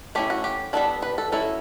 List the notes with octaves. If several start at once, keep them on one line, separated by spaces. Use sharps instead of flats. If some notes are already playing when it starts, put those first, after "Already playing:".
A3 C#4 E4 G4
F#4
G4
G3 B3 D4 A4
B4
A4
F#3 C#4 E4 A4